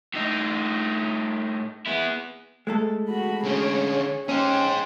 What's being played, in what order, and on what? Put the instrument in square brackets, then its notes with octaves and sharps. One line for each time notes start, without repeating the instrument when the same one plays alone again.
[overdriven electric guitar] A2 D#4
B3 E4
[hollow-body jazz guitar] G#3 A3 A4
[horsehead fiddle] F#4 B5
[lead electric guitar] D3 C#4 [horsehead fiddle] G#4 C#5
[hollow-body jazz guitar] C#4 [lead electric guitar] G#4 C5 [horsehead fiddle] G5